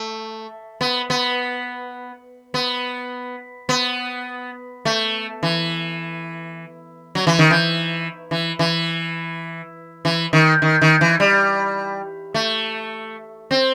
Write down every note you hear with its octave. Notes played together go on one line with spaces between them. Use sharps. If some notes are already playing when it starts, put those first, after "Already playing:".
Already playing: A3
B3
B3
B3
B3
A3
E3
F#3
E3
D#3
E3
E3
E3
E3
D#3
D#3
D#3
E3
G3
A3
C4